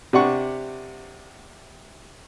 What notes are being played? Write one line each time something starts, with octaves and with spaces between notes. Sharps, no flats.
C3 D4 F#5 C#6